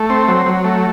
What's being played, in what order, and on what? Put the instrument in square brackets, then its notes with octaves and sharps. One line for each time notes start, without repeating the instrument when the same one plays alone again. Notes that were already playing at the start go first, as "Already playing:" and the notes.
Already playing: [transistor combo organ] A3
C4
F#3
F#3
A3